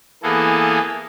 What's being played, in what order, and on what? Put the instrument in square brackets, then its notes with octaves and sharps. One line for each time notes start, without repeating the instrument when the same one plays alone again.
[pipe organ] E3 A#3 B3 G#4 A4